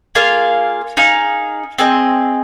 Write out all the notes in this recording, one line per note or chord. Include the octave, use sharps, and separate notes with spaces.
A#3 F4 G#4 F5
D#4 G#4 F5
C4 G#4 D#5